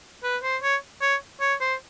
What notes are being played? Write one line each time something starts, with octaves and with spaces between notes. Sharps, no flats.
B4
C5
C#5
C#5
C#5
C5